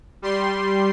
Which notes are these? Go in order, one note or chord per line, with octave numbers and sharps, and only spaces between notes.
G3 C6